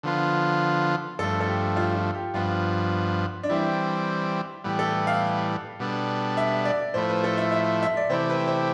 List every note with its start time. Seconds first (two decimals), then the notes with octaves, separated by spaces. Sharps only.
0.03 D3 F3 B3 F4
1.19 G2 F3 A3 A4
1.40 A4
1.48 G4
1.77 F4
1.96 F4
2.14 G4
2.34 G2 F3 B3 F4
3.43 D4
3.49 E3 G3 C4 E4
4.64 A2 E3 G3 B3 G4
4.79 A4
5.07 F5
5.79 B2 G3 B3 D4 A4
6.37 E5
6.65 D5
6.94 A2 F3 A3 E4 C5
7.09 B4
7.24 A4
7.37 E5
7.52 E5
7.82 E5
7.97 D5
8.09 C3 E3 A3 E4 G4 C5
8.29 B4
8.47 C5